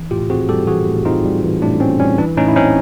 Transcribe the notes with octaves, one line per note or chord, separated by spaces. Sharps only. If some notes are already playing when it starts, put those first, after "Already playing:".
Already playing: E3
A2 F4 G4
C4 F#4 G#4
G3 G4 A4
E3 F#4 G#4
A2
C4 D#4 F4
G3
E3
A2 D4
C4 C#4
G3 C#4
E3 D4
A2 C#4 D#4
E4
C4 C#4 D#4